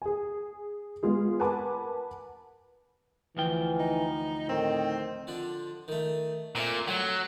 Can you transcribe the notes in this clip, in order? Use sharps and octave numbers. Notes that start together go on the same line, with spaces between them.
G#4 G#5
G#3 B3 F4 G#4
A#4 B4 F#5 G#5 A5 D6
D2 E3 F3 G5
D#4
A2 D#3 C4
D3 F3 D4
D#3 A3
A#2 A3 C4 F4
F#3 A3